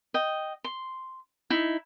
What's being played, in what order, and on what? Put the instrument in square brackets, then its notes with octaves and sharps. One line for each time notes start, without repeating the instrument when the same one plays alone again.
[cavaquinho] D#5 G5
C6
D#4 E4